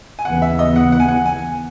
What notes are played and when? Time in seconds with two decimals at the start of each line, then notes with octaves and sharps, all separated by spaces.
0.19 G#5
0.25 D#2 C#3 E3 B3 F#5
0.42 E5
0.59 D#5
0.76 F#5
0.92 F#5
1.00 G#5
1.08 F#5
1.26 G#5